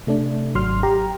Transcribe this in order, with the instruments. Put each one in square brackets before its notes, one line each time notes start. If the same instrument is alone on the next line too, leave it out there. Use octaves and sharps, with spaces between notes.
[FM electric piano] C3 A3 D4
G#1 F#3 C6 F6
G4 A#5